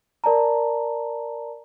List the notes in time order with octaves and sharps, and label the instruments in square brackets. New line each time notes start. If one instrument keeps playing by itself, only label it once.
[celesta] A#4 D5 A5 A#5